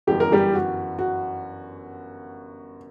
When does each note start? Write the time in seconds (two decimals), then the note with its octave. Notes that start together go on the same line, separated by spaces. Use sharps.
0.07 G1 F#2 E3 G3 G4
0.20 A#4
0.32 G3 G4
0.53 F#4
0.99 F#4